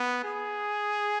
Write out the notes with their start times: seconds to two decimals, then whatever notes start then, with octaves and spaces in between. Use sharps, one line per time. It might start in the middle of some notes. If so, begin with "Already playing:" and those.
Already playing: B3
0.24 G#4